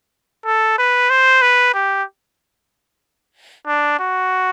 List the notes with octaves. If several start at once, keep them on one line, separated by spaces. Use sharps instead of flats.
A4
B4
C5
B4
G4
D4
F#4